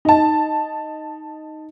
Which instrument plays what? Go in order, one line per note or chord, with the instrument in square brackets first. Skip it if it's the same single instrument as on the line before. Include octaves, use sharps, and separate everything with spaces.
[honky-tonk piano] D#4 A5